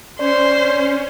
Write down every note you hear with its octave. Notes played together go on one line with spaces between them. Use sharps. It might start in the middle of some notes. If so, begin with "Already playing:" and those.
C#4 C5 D5